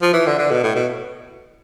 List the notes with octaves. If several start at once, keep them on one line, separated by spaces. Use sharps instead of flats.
F3
E3
D3
D3
B2
A2
B2